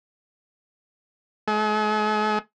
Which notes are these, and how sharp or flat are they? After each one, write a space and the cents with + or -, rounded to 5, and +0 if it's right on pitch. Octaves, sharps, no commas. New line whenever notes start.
G#3 +45